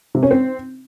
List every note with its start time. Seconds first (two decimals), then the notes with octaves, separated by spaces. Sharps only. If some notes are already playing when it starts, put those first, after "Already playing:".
0.15 C3
0.23 C#4
0.31 C4